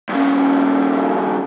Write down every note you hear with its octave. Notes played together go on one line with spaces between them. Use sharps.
G2 C#3